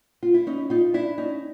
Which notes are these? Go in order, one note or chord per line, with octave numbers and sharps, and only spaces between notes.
F4
E4
C#4 D#4
D#4 F4
D4 E4
C#4 D#4